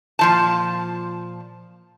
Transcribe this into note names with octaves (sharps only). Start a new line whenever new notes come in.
A#2 F3 A5